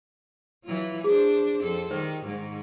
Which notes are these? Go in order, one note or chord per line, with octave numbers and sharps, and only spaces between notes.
E3 F#3 F4
D4 G#4 C5
F2 A4 C5
D#3 G3 C5
G#2 D#3